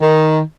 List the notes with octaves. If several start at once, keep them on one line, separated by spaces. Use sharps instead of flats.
D#3